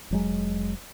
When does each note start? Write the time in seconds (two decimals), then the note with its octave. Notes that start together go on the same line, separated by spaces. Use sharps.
0.11 F1 F#3 G#3